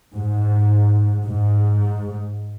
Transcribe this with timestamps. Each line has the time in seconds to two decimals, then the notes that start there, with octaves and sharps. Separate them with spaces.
0.15 G#2
1.24 G#2